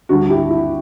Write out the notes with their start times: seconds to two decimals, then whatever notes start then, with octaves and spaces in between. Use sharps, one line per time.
0.09 D2 D3 G3 F#4
0.30 E4 G4
0.50 E4